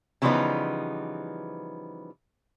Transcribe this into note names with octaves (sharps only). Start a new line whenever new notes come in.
C#3 E3 F3 G3 B3 D#4